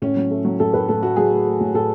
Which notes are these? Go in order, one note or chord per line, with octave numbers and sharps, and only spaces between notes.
A2 C#4
F#3
A3
F#3
A2 A4
A2 B4
A2 A4
A3 F#4
F#3 G#4
A3
A3
A2
A2 A4